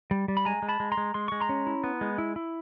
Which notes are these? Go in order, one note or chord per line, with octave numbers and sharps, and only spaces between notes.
G3
G3
B5
G#3 G#5 A#5
G#3
A5 B5
G#3
A#5 C6
G#3
G#3 C6
G#3 C#6
A#5 C6
C#4
E4
B3
G#3
E4
E4